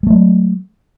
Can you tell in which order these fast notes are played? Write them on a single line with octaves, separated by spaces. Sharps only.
G#3 A3 F#3